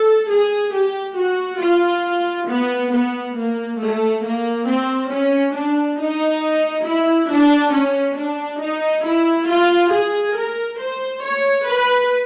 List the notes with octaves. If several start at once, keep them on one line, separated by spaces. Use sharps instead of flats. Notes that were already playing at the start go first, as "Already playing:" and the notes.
Already playing: A4
G#4
G4
F#4
F4
B3
B3
A#3
A3
A#3
C4
C#4
D4
D#4
E4
D4
C#4
D4
D#4
E4
F4
G#4
A#4
C5
C#5
B4